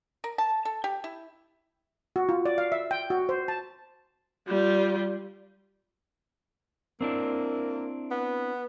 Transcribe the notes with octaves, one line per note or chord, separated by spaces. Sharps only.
A#4
A5
A4
G4
E4
F#4
F4
D5
F5
E5
G5
F#4
C5
A5
G3 F4
A#3 C4 D4 E4
B3